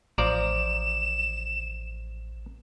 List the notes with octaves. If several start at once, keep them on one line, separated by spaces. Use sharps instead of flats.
A1 F3 D5 A#5 E7